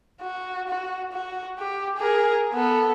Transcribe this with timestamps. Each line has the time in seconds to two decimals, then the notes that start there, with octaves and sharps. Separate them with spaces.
0.21 F#4
0.68 F#4
1.12 F#4
1.59 G4
1.97 G#4 A#4
2.54 B3 A4